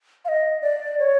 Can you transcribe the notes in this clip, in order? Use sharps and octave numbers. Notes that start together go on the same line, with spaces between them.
F5
D#5
D5
C#5